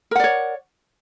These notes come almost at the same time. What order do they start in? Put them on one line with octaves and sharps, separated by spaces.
A#4 F#5 D5 C#5